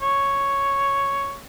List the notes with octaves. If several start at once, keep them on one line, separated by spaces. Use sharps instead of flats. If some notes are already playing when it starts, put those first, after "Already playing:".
C#5